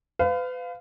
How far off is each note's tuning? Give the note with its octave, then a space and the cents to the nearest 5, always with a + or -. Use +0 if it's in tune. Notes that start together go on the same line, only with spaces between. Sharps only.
B4 +40 F5 +0